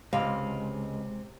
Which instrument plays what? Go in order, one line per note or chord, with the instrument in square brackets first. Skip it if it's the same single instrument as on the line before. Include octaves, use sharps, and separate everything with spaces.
[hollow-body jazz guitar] C#2 [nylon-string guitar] C3 [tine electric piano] G#3 [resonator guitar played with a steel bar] F5